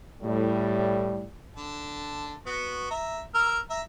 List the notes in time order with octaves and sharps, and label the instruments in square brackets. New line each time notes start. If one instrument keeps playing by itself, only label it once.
[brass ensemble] A2 G3
[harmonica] D3 A5
B3 F#4
E5 A#5
A#4 E6 F6
E5 A#5